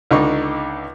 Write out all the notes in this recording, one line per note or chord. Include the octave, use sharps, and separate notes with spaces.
C#2 D3 D#4 C#6